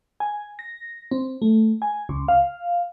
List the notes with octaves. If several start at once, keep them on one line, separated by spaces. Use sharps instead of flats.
G#5
A#6
C4
A3
G#5
C#2
F5